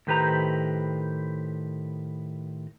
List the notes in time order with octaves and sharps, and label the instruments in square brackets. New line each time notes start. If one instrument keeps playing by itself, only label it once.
[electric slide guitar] A2 D#3 G4 B4 C5 A#5